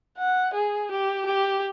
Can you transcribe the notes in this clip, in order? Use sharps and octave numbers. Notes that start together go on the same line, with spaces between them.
F#5
G#4
G4
G4